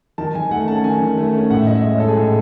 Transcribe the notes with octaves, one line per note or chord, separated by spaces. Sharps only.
D#3 A5
D#3 G#5
A3 F#5
C#4 A5
D#3 G#5
D#3
A3
C#4
A2 F#5
E5
A2 D#5
E5
G#3 D#5
C#5
D#4 A4
G#4
A2